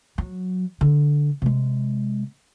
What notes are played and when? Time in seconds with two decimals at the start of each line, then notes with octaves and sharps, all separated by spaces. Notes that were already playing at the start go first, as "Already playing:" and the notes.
0.18 F#3
0.81 D3
1.42 C3 G#3